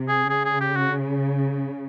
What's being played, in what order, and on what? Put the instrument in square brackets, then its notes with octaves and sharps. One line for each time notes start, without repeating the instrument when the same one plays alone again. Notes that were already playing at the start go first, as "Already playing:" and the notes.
Already playing: [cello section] C3
[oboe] G#4
[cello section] C#3 [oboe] G#4
[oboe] G#4
G4
F#4